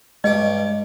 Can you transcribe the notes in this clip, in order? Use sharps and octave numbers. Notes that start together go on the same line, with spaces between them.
G2 G#3 C#5 D#5 D6